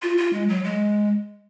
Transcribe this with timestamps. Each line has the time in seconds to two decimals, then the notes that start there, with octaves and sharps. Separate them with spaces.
0.03 F4
0.18 F4
0.33 G#3
0.49 F#3
0.64 G#3